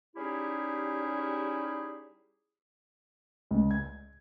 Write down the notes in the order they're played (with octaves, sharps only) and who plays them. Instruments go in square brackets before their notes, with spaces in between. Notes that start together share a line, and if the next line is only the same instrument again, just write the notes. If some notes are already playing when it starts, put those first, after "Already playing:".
[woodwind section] G3 C#4 D#4 E4 G4 G#4
[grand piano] C#2
G#6